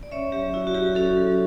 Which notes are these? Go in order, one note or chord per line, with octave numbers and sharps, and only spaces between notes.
D5
C#4 C#5 E5
F#3 G4
E4 F#4
F#4
F#3 G4
C#4 F#4 A4
F#3